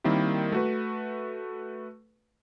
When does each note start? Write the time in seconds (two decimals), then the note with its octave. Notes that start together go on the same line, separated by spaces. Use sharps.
0.04 D#3 G3 A#3 C4 E4
0.52 A3 F#4 B4